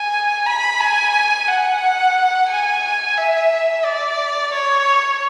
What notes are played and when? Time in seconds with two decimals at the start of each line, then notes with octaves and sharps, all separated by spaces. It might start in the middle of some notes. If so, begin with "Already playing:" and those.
Already playing: G#5
0.47 B5
0.80 G#5
1.48 F#5
2.49 G#5
3.17 E5
3.85 D5
4.53 C#5